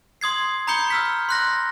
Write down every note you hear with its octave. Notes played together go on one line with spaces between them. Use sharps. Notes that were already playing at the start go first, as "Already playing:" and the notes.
C6 D#6 G#6 C7
A#5 B5 D#6 G6 C#7 G7
E6 F6 B6
C6 F#6 A#6